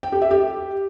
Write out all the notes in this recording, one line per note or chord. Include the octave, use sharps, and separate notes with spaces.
G5
G4
E5
G4